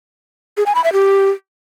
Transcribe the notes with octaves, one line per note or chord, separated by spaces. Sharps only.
G#4
G#5
B5
E5
G4